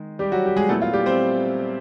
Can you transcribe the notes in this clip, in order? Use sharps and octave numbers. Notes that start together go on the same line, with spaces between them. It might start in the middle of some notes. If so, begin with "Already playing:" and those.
Already playing: D#3 G#3
G3 G4
F#3 F#4
G4
G#3 G#4
A#2 F#3 A3 B3 E4 A4
F4
G3 G4
C4 C5